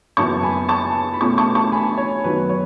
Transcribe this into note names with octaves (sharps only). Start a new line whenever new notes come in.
F#1 F#2 E3 B3 A5 C#6
G#5 B5
A5 C#6
B5
E2 B2 A3 C#4 A5 C#6
A5 C#6
A5 C#6
G#5 B5
C#5
F#2 D#3 F#3 B3 B4
C#5